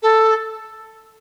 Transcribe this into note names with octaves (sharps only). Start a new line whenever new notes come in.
A4